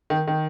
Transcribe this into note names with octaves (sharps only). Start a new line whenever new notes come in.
D#3
D#3